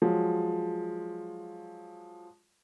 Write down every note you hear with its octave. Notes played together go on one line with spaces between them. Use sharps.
F3 F#3 G#3